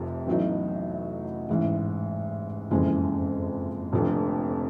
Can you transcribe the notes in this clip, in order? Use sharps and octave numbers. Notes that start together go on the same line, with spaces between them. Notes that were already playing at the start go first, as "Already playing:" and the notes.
Already playing: F1 F2 C3
A1 A2 F#3 B3 D#4
A1 G#2 E3
F#1 F2 C#3 E3 G#3
F1 F2 D3